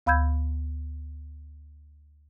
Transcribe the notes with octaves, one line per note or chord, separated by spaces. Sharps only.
D2 F5 B5 E6 G6 G#6